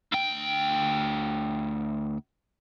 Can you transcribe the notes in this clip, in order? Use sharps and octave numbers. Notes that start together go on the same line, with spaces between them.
D2 G5